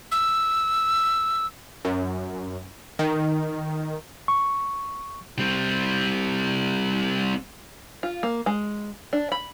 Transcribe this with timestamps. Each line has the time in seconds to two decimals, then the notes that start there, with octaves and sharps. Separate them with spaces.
0.11 E6
1.85 F#2
2.99 D#3
4.28 C#6
5.39 G3 C4
8.03 F4
8.23 A#3
8.46 G#3
9.13 D4
9.32 B5